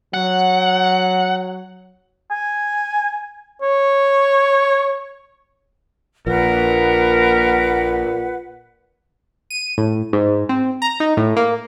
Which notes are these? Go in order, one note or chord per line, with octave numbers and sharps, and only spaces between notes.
F#3 F#5
G#5
C#5
A#1 A#2 A#4 B4 F#5
D#7
A2
G#2
C4
A#5
D#4
A2
A#3